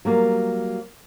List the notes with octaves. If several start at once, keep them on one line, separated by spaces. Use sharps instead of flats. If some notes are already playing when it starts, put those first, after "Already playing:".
F#3 G3 A#3